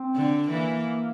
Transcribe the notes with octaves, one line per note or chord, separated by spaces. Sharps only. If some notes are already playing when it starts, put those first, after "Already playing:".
Already playing: C4
D3
E3 A#3